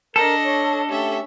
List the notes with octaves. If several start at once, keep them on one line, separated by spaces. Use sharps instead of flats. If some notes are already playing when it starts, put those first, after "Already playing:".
D4 A4 A#4 D#5
C#5
A3 C#4 G4 E5